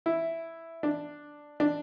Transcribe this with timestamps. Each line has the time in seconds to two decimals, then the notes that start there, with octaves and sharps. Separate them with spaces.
0.06 E4
0.83 D4
1.60 D4